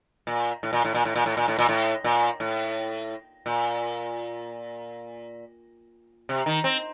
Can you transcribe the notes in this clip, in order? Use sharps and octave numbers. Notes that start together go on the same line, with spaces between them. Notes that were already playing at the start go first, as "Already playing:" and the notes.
A#2
A2
A#2
A2
A#2
A2
A#2
A2
A#2
A2
A#2
A2
A#2
A2
A#2
C3
D#3
C4